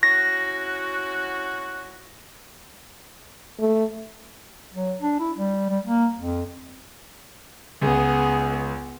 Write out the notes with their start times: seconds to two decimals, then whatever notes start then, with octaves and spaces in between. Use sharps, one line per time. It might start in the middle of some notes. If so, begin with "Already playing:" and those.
0.03 C#4 E4 F#4 A#6
3.60 A3
4.73 F#3
5.01 D4
5.20 E4
5.38 G3
5.69 G3
5.85 A#3
6.20 F2
7.81 C#2 B3 G#4